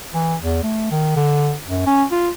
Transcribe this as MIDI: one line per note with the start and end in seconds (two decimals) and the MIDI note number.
0.14 0.36 52
0.41 0.58 40
0.63 0.87 57
0.91 1.14 51
1.16 1.53 50
1.68 1.86 42
1.86 2.04 61
2.11 2.29 65